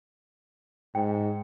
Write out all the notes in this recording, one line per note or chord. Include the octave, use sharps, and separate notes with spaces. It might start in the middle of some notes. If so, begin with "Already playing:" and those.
G#2 G5